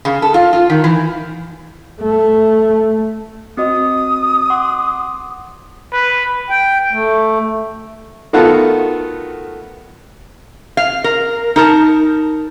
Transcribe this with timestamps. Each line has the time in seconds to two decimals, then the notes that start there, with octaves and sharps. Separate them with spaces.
0.05 C#3
0.22 A4
0.34 F4
0.53 F4
0.70 D#3
0.84 E3
2.01 A3
3.57 C4 F#4 D#5 D#6
4.50 F#5 C6 D6
5.93 B4
6.50 G5
6.93 A3
8.33 D#3 A3 B3 F4 F#4 A4
10.77 F5
11.04 A#4
11.56 D#4 A#4 A5